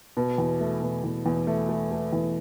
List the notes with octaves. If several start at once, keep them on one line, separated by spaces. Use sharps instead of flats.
B2
E2
A3
B2
E2
E2
A3
A3
A3
E2